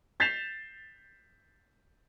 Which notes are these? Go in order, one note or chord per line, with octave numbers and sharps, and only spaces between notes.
G6 A6 B6 C7 E7 F7